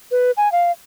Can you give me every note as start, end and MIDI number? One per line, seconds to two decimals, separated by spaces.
0.11 0.31 71
0.37 0.51 80
0.52 0.71 77